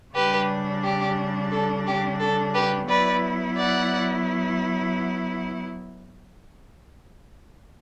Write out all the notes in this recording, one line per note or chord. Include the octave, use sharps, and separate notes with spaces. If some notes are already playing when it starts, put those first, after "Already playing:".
C#3 G3 D4 G4 B4
G4
A4
G4
A4
G4 B4
F#3 B3 E4 B4 D5
D5 F#5